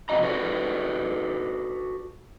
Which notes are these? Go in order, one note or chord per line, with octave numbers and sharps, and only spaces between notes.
F2 C3 D#3 F#4 D#5 A#5
F#4 A4 B4 D5